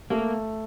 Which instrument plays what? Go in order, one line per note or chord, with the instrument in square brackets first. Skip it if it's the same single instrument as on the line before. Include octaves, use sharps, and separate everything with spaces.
[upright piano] A3 [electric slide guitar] A#3